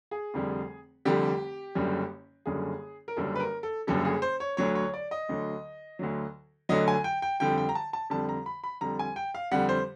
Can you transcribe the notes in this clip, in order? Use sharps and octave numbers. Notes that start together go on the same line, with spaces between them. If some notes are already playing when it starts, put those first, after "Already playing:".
G#4
F1 F2 D3 G3
F1 F2 D3 G3 G4
F#1 F#2 D3 G3
F#1 F#2 D3 G3 G#4
A#4
F#1 F#2 D3 G3 A4
B4
A#4
A4
F#1 F#2 D3 G3 A4
G#4
C5
C#5
D2 D3 F#3 C#5
C#5
D5
D#5
D2 D3 F#3
D2 D3 F#3
D2 D3 F#3 D#5
G#5
G5
G5
F2 D3 G3 G5
G5
A#5
A5
A5
F2 D3 G3 A5
A#5
B5
B5
F2 D3 G3 A#5
G#5
G5
F5
F2 D3 G3 F#5
C5